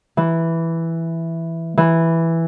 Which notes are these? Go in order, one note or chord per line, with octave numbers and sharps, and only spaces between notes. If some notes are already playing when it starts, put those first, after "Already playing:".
E3
E3